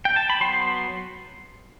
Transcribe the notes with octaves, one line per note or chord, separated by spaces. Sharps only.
G5
A5
B5
F#3 B3 C6